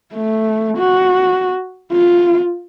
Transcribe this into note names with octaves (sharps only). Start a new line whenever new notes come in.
A3
F#4
F4